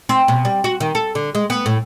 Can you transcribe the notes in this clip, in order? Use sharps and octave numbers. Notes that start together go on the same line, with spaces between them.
C4
B2
G3
F#4
D#3
A4
D3
G#3
B3
A2